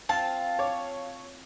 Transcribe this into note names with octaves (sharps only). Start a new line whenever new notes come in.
C4 F4 F5 A5
C#5 D6